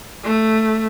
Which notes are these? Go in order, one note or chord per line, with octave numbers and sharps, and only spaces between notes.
A3